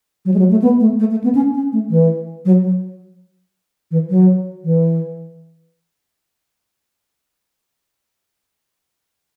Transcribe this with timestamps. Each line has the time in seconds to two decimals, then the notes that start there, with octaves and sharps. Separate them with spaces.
0.25 F#3
0.34 G#3
0.39 F#3
0.51 A3
0.62 B3
0.80 A3
1.00 A3
1.11 A3
1.24 B3
1.35 C#4
1.54 C#4
1.73 A3
1.90 E3
2.45 F#3
2.64 F#3
3.91 E3
4.10 F#3
4.64 E3